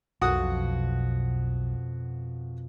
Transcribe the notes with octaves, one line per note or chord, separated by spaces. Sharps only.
B1 F2 B2 F#4 F#5 D#6